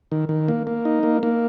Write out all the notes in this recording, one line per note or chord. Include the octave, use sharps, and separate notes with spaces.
D#3
D#3
A#3
A#3
D#4
A#3
A#3